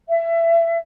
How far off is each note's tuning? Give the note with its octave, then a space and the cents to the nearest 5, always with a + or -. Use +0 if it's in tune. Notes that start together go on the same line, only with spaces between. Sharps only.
E5 +25